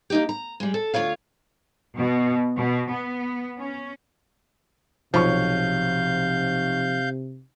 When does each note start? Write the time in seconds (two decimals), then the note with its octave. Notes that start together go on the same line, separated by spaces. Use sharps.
0.10 A#3 D#4 G4
0.29 A#5
0.60 G3 G#3
0.74 A4
0.94 D2 D#3 F4 C#5 F5
1.97 B2
2.57 B2
2.90 B3
3.58 C#4
5.14 B1 C3 F3 C#5 F5 C#6 G6